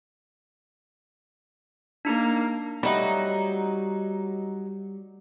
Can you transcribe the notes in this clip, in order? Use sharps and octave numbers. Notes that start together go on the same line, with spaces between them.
A#3 D4 D#4
F#3 G3 A3 D#4 F#4 B5